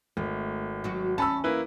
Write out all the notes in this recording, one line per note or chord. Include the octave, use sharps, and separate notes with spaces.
G#1 A3
F#3 F#4
E2 C#4 A5 B5 E6
A#3 E4 B4